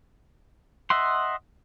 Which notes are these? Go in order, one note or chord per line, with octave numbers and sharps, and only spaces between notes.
D#5 E5 F#5 C6